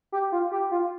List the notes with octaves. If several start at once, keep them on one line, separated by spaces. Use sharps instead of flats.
G4
F4
G4
F4